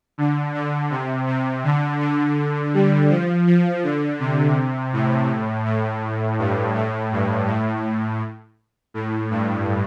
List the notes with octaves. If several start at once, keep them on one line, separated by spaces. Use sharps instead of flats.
D3
D3
C3
C3
D3
D3
G3
F3
F3
D3
C3
A2
A2
G2
A2
G2
A2
A2
G2